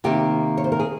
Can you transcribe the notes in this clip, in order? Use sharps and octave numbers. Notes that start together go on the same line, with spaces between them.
C3 D#3 A#3 G4
C#5
C5
A#4
G#4